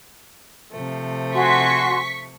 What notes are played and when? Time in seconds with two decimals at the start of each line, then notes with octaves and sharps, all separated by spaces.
0.72 C3 F3 A3
1.35 F#4 G#5 C6 C#6 B6